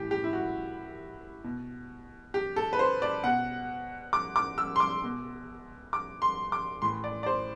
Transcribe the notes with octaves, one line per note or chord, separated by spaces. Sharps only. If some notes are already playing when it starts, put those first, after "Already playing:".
Already playing: A2 E3 G4
G4
E4
F#4
B2
G4
A4
B4
C5
D5
B2 F#5
D6
D6
E6
C6
D6
B2
D6
C6
D6
A2 E3 C6
D5
D5
C5